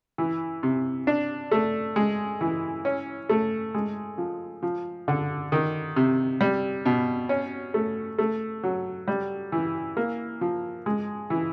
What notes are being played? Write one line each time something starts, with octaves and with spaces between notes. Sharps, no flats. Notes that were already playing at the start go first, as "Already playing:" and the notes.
E3
C3
D4
A3
G#3
E3
C#4
A3
G#3
F3
F3
D3
D#3
C3
G3
B2
C#4
A3
A3
F#3
G3
E3
A#3
F3
G#3
E3